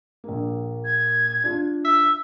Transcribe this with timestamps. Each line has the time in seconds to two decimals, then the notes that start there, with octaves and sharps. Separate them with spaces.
0.24 A#1 A#3
0.85 G#6
1.44 D4 F4
1.85 E5 E6